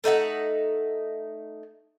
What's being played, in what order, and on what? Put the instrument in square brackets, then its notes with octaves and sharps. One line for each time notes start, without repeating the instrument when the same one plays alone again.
[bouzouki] A3 D#4 E5 F#5